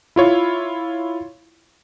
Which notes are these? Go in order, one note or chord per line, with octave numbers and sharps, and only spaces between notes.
E4 F4 C#5